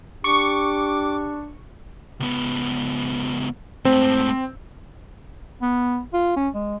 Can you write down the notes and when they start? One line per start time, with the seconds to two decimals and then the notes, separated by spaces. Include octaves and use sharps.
0.24 D4 G4 C#6 D6
2.20 C#2 B3
3.85 G#2 A3 C4
5.62 B3
6.13 F4
6.36 C#4
6.54 G#3